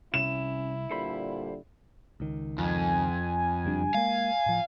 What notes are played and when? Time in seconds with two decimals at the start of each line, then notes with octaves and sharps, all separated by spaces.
0.14 C2 C#4 E4 E7
0.91 A#2 D3 G3 A4 C5 B5
2.20 C#2 D#3
2.58 F2 G#5
3.65 F#1 G3 D4
3.94 G#3 A#3 F5
4.46 A2 F3